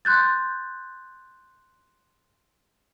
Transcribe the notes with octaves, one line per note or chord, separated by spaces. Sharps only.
C6 F#6 G6 A6